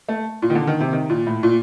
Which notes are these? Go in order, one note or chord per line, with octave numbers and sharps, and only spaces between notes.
A3
A#2
D#3
D3
D#3
C3
D#3
A#2
A2
A#2